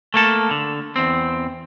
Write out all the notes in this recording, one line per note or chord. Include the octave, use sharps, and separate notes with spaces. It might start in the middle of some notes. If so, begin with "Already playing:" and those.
A3 A#3 A4
D3
E2 C4